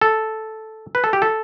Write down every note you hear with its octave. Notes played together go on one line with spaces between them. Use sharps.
A4
B4
A4
G4
A4